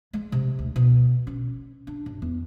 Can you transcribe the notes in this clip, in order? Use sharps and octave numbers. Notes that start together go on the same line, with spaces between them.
G#3
C3
D2
B2
C#4
D4
F#2
E2